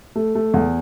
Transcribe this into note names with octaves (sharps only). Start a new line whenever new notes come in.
A3
A3
E2